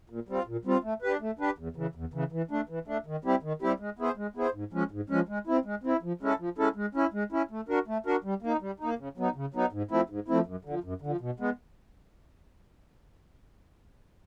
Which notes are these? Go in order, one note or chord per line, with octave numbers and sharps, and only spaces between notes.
A#2
G3 C4 F4
A#2
G3 C4 F4
A3
D4 G4 B4
A3
D4 G4 B4
E2
C#3 E3
E2
C#3 E3
E3
A3 D4
E3
A3 D4
D#3
G3 C4 E4 G4
D#3
G3 C4 E4 G4
G#3
B3 E4 G#4 C5
G#3
B3 E4 G#4 C5
G#2
F3 G#3 C#4
G#2
F3 G#3 C#4
G#3
C4 E4
G#3
C4 E4
F3
G#3 C#4 E4 A4
F3
G#3 C#4 E4 A4
G#3
C#4 E4
G#3
C#4 E4
A3
D4 F#4 A#4
A3
D4 F#4 A#4
G3
A#3 D#4
G3
A#3 D#4
C#3
F#3 B3 D#4
C#3
F#3 B3 D#4
G#2
F3 A3 C4 E4
G#2
F3 A3 C4 E4
F#2
D3 F3
F#2
D3 F3
B2
G#3 B3